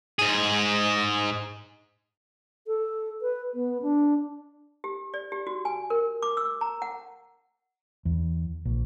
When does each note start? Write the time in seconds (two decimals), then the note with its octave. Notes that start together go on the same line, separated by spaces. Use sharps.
0.19 G#2 G#4
2.67 A4
3.22 B4
3.54 B3
3.82 D4
4.84 G4
5.14 D5
5.32 G4
5.47 F#4
5.65 G#5
5.90 A#4
6.23 D6
6.37 E6
6.61 A#5
6.82 F#5
8.05 E2
8.65 A#1